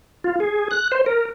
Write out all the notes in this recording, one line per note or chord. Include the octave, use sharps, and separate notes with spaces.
F4
G#4
F#6
C5
A#4